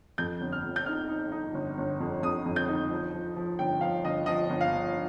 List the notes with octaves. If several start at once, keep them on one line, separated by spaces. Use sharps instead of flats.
F2 G6
G1
F6
F2
G6
D#4 F6
D#4
D#4
G1
G1
F2
F2 D#6
F2
G6
D#4
F3
F3
F3
G1 G5
F3 F5
G1 D#5
F3 D#5
G1
F5
F3